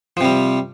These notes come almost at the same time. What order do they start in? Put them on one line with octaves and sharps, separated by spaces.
F3 C3 G3